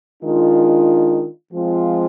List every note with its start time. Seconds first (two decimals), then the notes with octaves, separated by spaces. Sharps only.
0.23 D#3 G#3 D4 F4
1.51 F3 G#3 C4 F4